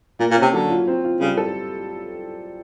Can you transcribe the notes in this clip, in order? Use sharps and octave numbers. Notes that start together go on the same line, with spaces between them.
A#2 A#3
A#2
C#4
C3
D3 F#3
F4
C4
F4
C#3 G3
A4